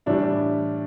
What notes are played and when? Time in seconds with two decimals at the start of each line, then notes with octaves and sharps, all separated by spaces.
0.06 A2 E3 G3 D4 E4